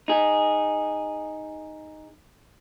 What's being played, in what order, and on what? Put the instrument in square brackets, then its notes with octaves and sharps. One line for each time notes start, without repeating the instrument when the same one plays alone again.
[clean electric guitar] D#4 G#4